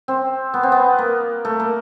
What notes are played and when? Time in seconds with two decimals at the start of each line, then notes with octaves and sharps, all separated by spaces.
0.08 C4
0.54 B3
0.63 C4
0.72 B3
0.99 A#3
1.45 A3
1.60 A#3